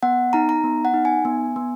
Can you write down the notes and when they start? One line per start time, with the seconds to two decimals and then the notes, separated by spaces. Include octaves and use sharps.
0.03 B3 F#5
0.33 D#4 A#5
0.49 A#5
0.64 B3
0.85 F#5
0.94 D#4
1.05 G#5
1.25 B3
1.56 B3